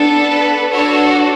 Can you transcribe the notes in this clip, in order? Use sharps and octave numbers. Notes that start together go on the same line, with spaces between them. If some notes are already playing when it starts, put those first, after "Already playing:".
Already playing: B3 D4 A4
B4
D4 F#4 A4 C#5